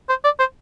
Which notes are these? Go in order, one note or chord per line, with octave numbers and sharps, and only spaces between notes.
C5
D5
C5